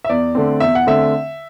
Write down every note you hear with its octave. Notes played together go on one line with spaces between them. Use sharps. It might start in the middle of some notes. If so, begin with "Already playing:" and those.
E5
E2 D5
D3 A3 C4
E2 E5
F#5
D3 A3 C4 E5